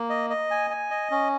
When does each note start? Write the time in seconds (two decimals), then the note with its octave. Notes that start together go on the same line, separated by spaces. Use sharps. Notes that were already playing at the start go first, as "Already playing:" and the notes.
Already playing: A#3
0.10 D#5
0.30 D#5
0.51 G#5
0.70 G#5
0.91 D#5
1.11 C#4